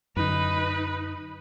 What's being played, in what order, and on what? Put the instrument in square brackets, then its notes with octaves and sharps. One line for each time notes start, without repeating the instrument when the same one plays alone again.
[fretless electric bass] F#2 D3 [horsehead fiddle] D#4 [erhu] B4